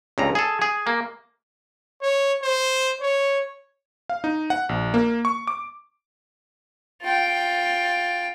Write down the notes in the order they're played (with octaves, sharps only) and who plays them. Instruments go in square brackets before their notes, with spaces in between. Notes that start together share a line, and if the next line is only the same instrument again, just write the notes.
[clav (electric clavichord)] C#2 G2 A#5
G#4 A4
G#4
A#3
[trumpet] C#5
C5
C#5
[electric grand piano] F5
D#4
F#5
A#1
A#3
C#6
D6
[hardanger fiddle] F4 G5